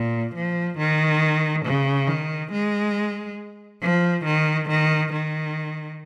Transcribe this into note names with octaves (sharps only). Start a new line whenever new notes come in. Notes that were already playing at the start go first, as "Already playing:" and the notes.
Already playing: A#2
F3
D#3
C#3
D#3
G#3
F3
D#3
D#3
D#3